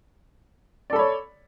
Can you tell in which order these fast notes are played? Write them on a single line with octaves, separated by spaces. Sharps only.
D5 A4 B5 C#5